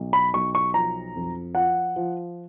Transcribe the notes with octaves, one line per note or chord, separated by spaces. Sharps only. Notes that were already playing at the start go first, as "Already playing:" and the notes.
Already playing: B1
B5
B1 C#6
C#6
F3 A#5
F2
F3 F#5
F3